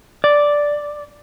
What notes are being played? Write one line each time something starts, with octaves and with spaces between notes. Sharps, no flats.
D5